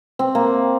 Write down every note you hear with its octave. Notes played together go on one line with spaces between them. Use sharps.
C4
A#3